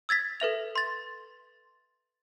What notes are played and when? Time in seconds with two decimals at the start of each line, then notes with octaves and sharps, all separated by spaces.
0.09 E6 G#6 A6 B6
0.40 A4 B4 E5 F7
0.75 C6 A6